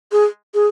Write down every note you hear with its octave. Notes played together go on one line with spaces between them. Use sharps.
G#4
G#4